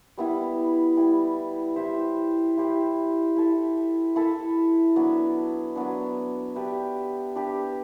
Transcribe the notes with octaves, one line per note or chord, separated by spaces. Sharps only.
G3 B3 E4
G3 B3 E4
E4 G4 C5 E5
E4 G4 C5 E5
E4 A4 E5
E4 A4 E5
F#3 B3 D4
F#3 B3 D4
D4 G4 B4 E5
D4 G4 B4 E5